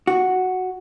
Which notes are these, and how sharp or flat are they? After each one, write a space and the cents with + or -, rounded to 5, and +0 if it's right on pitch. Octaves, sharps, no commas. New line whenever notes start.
F#4 +0